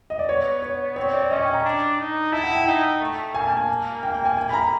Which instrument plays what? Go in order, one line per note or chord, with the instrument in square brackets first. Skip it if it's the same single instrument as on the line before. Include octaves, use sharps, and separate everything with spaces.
[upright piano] D#5
D5
[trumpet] B3 [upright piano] C#5
[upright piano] C#5
[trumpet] C4 [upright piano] C#5
[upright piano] D5
[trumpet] C#4 [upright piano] D#5
[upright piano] G5
A#5
[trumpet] D4
D#4
[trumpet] E4 [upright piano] A5
[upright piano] F#5
G5
[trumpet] D#4
A3
[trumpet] A#3 [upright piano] G#5
[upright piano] A5
G#5
[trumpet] A#3 [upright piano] G5
[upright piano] G5
G#5
G#5
B5
A#5